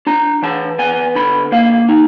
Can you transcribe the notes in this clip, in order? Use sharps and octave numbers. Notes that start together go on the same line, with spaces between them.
D4 A#5
E3 A5
B3 G#5
D3 B5
A#3 F5
D#4